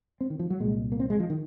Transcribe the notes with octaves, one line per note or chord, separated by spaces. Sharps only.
C4
D#3
F3
F#3
C2 A#2 G#3
A#3
C4
G#3
F3
D#3